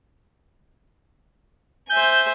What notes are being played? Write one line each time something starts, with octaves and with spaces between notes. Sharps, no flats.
C5 E5 G#5 G6